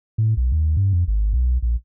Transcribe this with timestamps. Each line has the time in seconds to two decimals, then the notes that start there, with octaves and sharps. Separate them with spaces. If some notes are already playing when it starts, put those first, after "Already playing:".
0.18 A2
0.37 B1
0.52 D#2
0.77 G2
0.93 F2
1.08 G#1
1.33 B1
1.62 A#1